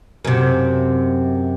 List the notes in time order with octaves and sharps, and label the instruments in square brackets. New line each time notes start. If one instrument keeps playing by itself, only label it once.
[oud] F#2 C3